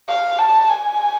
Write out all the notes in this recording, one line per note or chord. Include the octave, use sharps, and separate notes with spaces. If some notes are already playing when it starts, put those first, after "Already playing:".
F5
A5
G#5